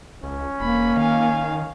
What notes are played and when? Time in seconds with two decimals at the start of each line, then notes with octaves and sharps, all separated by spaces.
0.23 C#2 C#4
0.60 E1 A#3 B5
0.97 D#3 F5 G#5